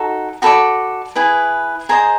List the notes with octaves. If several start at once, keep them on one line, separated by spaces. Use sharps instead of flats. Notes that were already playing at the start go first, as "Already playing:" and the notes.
Already playing: D#4 F#4 A4
F#4 A4 D5 B5
E4 G#4 B4
G#4 C5 D#5 A#5